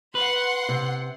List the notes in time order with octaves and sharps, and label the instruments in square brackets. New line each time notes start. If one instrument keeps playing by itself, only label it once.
[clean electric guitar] B4 [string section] F#5 C6
[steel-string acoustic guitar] C3